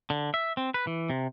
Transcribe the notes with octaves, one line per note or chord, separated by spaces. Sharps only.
D3
E5
C4
B4
E3
C3